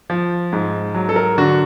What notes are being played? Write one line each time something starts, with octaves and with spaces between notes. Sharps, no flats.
F3
G#2
F#3
A4
A#4
D3 F#4